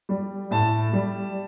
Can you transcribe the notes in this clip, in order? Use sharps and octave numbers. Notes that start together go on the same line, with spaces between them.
G3
A2 A5
G3